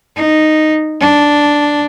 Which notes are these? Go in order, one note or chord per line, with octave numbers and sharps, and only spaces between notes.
D#4
D4